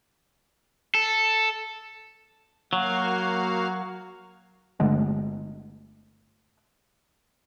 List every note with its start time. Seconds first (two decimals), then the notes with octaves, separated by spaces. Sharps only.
0.95 A4
2.73 F#3 A#3 F#4 F5
4.80 G1 D3 G#3 A3